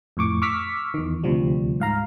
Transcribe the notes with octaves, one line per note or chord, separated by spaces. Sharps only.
F2 A2 C#6 D6
C#6 D6 E6 F6 B6
E2 D#3
D2 C3 F3 G3
G#2 F5 A#5